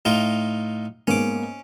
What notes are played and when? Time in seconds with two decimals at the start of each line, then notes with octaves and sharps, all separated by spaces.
0.05 A2 D#4 F4
1.08 G#2 A#3 B3 C#4 D6